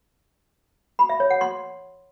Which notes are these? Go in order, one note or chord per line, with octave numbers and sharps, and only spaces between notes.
B5
E5
C#5
F#5
C6